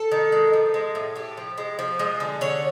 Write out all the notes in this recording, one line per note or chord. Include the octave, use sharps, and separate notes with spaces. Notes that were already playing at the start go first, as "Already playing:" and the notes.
Already playing: A4
D#3
G#3
F3
G#3
A2
A2 G4
F3
G#3
F3
G#3
D3
D3 C#5